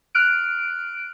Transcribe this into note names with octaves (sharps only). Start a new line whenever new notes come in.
F6 F#6 D7